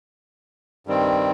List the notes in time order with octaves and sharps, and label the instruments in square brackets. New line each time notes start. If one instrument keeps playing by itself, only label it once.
[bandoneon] G2 D#3 G3 C4